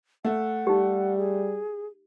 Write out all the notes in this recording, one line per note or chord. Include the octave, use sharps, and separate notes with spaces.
A3 F#5
G3 D#4 G4
G#4